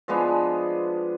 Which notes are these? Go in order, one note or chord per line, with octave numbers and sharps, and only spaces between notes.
F3 G#3 B3 D4